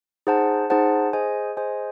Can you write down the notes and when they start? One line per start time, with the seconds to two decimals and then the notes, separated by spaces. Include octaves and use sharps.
0.27 D#4 G#4 C5 F#5 A5
0.70 D#4 G#4 C5 F#5 A5
1.13 G#4 C5 D#5 G#5
1.57 G#4 C5 D#5 G#5